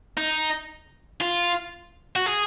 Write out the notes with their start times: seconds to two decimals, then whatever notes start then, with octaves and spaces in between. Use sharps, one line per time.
0.17 D#4
1.21 F4
2.16 F#4
2.26 G#4